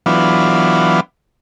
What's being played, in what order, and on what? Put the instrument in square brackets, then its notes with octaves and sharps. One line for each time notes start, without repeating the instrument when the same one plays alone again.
[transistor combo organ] E3 F#3 B3 D4 F4